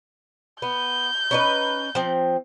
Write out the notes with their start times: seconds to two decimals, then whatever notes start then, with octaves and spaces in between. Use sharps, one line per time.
0.62 B3 G6
1.31 C#4 D#4 B4
1.95 F3 C4